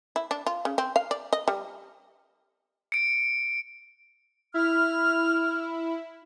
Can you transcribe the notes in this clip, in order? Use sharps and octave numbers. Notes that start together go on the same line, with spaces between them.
E4
D4
F4
C#3
C4
F5
D5
D#5
G3
C#7 D7
E4 F6